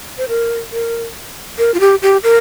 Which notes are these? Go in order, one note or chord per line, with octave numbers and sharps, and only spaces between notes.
C5
A#4
A#4
A#4
F4
G4
G4
A#4